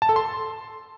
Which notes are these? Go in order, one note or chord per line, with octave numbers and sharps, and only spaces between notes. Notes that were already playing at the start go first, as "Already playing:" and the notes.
A5
A4
C6